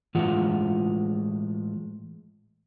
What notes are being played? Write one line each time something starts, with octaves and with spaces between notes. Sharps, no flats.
A2 E3 G#3 F4 F#5